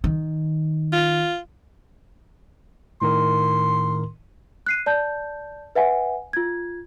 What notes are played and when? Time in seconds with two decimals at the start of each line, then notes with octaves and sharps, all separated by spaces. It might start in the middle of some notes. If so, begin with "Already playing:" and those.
0.04 D#3
0.93 F4
3.02 A2 D#3 A#4 C6
4.66 F#6 C7 D#7
4.86 D5 A5 G6
5.75 B4 E5 F#5 G#5
6.33 F4 G#6